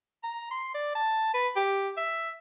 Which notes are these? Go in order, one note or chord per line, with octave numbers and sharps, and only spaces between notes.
A#5
C6
D5
A5
B4
G4
E5